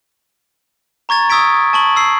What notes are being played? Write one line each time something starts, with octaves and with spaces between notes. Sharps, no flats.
A#5 C#6 G#6 A6
C#6 D#6 E6 G#6 B6 D7
A5 C#6 F#7
E6 C7